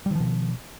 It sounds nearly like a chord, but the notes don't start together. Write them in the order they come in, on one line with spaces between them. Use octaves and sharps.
G3 D#3 F3 B2